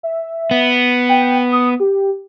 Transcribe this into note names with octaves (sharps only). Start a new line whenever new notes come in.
E5
B3
G5
D#6
G4